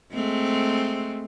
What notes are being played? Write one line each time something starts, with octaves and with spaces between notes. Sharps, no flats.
G#3 A3 C4